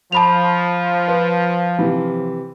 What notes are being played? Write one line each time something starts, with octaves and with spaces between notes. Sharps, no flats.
F3 A5 B5 F7
B4
C3 E3